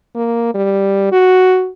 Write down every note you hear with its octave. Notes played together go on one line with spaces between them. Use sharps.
A#3
G3
F#4